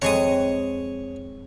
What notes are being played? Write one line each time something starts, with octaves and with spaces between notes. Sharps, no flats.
F2 G#3 C#5 C#6 D#6